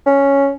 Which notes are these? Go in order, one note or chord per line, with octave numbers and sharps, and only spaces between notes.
C#4